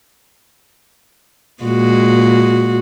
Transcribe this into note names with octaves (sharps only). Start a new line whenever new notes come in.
A#2 G#3 F#4